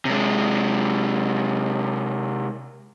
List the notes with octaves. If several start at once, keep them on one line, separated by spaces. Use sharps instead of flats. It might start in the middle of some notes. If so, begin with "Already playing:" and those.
C3 G#3